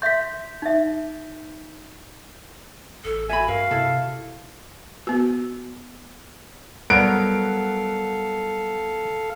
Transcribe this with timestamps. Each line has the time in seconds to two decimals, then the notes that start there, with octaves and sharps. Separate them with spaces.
0.02 E5 C6 G6 B6
0.62 D#4 E5
3.05 A1 A4
3.29 F#4 E5 G#5 B5
3.48 G2 A#4 F5
3.71 C3 E4 A4
5.07 B3 F#4
6.90 F#3 G3 B3 A4 A#4 F5 D7